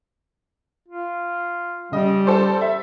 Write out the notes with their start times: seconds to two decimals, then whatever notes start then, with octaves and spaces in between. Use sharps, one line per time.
0.88 F4
1.92 C#3 G3 D#5
2.26 A4 C5 D5
2.61 E5